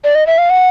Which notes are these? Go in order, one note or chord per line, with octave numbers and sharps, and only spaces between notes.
D5
D#5
E5
F5
F#5